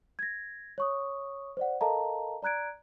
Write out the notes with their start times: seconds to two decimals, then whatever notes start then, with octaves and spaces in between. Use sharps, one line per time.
0.19 G#6 A#6
0.78 C#5 C#6 D#6
1.57 C5 D5 F#5
1.81 A4 A#4 D#5 F5 A5 A#5
2.42 D5 A#5 F#6 G#6 D7